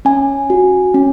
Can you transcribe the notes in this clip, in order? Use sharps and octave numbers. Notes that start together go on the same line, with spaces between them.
C#4 G#5
F#4
C#4